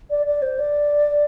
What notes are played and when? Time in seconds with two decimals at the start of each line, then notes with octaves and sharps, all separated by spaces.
0.10 D5
0.26 D5
0.42 C5
0.59 D5